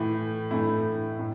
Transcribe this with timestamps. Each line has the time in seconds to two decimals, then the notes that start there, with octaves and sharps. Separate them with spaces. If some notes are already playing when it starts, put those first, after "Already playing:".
Already playing: A2 E3 A3 E4
0.51 A2 E3 A3 E4
1.19 A2